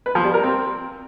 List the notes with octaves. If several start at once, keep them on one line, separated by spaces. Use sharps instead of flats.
B4
F3
G3
A#4
C4